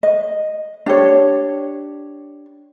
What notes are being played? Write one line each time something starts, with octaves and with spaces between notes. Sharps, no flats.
D#5
D4 G4 C#5